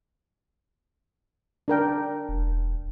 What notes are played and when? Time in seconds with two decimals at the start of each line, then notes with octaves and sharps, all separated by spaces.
1.68 D4 A#4 G5
2.29 E1